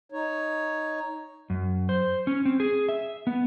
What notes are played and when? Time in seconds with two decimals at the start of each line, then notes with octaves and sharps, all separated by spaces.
0.12 D#4 C#5
1.50 F#2
1.89 C5
2.27 C#4
2.45 C4
2.60 G#4
2.89 E5
3.27 B3